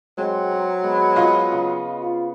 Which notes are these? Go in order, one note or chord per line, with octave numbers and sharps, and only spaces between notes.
F#3 G#3 C4
A#5 C#6
G#3 B3
F4 D#5 B5 C#6
C#3
F4